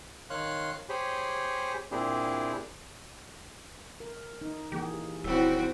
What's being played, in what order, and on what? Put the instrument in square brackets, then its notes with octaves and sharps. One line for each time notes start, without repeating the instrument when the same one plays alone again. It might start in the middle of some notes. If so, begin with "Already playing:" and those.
[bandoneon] D#3 C#5 F5 C6 F#6
G4 G#4 C5 C#5 G#5 B5
A#2 C4 D4 E4 G4 G#4
[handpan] A#4
D#4
[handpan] E3 A#3 G#4 [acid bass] G4
[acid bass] D#1 [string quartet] G3 C4 F#4 [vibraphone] E4 C#5 G5